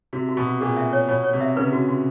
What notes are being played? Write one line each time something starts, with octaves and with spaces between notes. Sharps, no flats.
C3 F#4
F#4
B2
F#4
A#2 G#4
E5
C#5
B2 C#5
C#5
C3
E5
C#3 B4
F#4
F#4